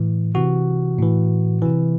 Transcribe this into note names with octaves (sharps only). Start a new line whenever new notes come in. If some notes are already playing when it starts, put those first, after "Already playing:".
Already playing: A2 E3
C3 E3 F#4
A2 E3
C3 E3